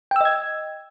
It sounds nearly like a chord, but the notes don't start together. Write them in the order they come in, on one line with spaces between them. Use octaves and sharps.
G5 E6 D#5 G#6